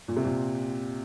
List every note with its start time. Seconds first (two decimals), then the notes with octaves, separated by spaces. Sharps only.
0.08 A#2
0.16 C3
0.24 A#2